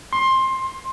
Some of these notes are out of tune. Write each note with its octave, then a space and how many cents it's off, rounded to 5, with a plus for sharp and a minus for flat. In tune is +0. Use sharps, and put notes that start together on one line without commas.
C6 +20